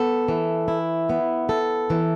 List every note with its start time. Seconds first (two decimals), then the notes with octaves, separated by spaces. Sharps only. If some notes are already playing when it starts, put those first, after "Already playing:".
Already playing: B3 A4
0.29 E3
0.68 E4
1.10 B3
1.49 A4
1.90 E3